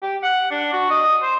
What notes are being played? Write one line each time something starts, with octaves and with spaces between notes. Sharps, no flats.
G4
F#5
D4
F#4
D#5
C5